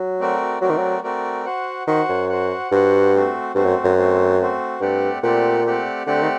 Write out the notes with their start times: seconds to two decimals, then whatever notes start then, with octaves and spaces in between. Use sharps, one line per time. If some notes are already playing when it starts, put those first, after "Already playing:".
Already playing: F#3
0.20 A3 C4 F#4 A#4 D5
0.61 F#3 A3 C4 F#4 A#4 D5
0.70 D#3
0.77 F#3
1.04 A3 C4 F#4 A#4 D5
1.45 F#4 C5 F#5
1.87 D#3 F#4 C5 F#5
2.09 F#2
2.29 F#4 C5 F#5
2.71 G2 F#4 C5 F#5
3.13 A3 C4 F#4 C5
3.55 G2 A3 C4 F#4 C5
3.65 F#2
3.84 F#2
3.97 A3 C4 F#4 C5
4.39 A3 C4 F#4 C5
4.81 G2 A3 C4 G4 D5 F#5
5.23 A#2 A3 C4 G4 D5 F#5
5.64 A3 C4 G4 D5 F#5
6.06 D3 A3 C4 G4 D5 F#5
6.23 D#3